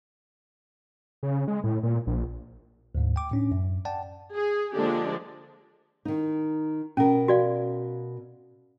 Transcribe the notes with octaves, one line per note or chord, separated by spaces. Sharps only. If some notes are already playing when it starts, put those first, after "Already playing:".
C#3
G#3
A2
A#2
A#1
D2 G#2
G5 D6
A2 C#4 D4
F#2
D5 F#5 G5 A5
G#4
D3 F3 G#3 A#3 D4 G4
D#3 D#4
B2 C#4 A#4
F#4 D5 F5